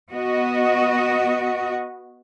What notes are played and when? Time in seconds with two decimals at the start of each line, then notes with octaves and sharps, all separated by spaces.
0.11 B3 F#4 D#5